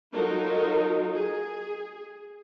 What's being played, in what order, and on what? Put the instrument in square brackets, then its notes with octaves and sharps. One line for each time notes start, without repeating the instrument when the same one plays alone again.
[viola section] F#3 D#4 F4 F#4 A4 A#4
G#4